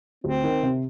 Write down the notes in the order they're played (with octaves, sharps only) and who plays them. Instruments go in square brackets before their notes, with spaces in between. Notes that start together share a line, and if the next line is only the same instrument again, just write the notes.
[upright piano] D2 [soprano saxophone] C4
[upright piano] D#3
C3